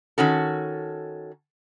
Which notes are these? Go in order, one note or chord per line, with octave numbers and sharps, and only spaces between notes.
D#3 C#4 F#4 A4